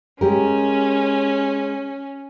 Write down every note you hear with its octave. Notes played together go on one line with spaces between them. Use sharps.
G#3 C#4 G4 A#4